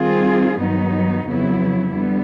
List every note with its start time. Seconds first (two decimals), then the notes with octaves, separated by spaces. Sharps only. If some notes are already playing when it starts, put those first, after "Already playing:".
Already playing: D#3 G3 C4 F4 G#4
0.58 G2 D#3 F#3 B3 D#4
1.26 F2 C#3 F#3 B3 E4
1.93 D3 G3 B3